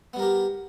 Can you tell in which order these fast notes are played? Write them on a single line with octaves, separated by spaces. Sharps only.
B3 G3 A#4 G4